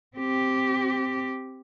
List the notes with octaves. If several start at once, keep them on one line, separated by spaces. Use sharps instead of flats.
C4 G4